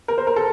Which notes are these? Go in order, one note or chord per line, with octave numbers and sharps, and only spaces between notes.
A#4
C5
A#4
A4